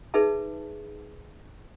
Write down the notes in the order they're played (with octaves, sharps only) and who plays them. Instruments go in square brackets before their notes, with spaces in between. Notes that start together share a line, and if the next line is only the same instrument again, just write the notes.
[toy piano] D#4 G#4 B4 E5 A5